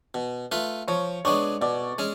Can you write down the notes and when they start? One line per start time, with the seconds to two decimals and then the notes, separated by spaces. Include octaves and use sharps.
0.14 B2
0.52 A3 F4 B4
0.88 F3 C#5 C#6
1.25 G#3 B3 D4 C#5 C#6
1.61 B2 D5 D6
1.98 G#3 C#4